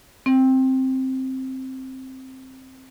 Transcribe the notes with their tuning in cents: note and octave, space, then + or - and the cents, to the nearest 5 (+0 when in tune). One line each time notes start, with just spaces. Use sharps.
C4 +5